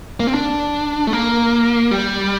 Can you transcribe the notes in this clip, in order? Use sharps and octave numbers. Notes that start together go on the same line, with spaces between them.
A#3
C4
D4
A3
A#3
G3